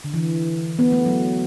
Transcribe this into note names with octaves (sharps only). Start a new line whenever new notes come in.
D3
E3
B3
A3
F#3